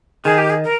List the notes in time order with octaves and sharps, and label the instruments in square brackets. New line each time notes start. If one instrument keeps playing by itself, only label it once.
[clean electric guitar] D#3 [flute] G#4
[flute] G4
G#4
A#4